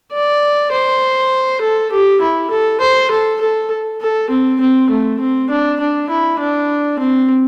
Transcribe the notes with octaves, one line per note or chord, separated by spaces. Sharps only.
D5
C5
A4
G4
E4
A4
C5
A4
A4
A4
C4
C4
A3
C4
D4
D4
E4
D4
C4